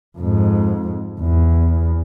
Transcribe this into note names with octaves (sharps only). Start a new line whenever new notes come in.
F2 G#2
E2